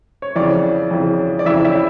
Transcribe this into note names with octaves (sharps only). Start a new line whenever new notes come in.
C#5
F2 C#3 E3 D5
F2 C#3 E3
D5
F2 C#3 E3 E4 E5
E4 E5